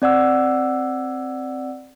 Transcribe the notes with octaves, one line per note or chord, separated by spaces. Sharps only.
C4 D5 F#5 E6